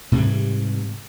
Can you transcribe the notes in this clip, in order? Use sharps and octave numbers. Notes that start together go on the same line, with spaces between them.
G#2 C3 E3 G3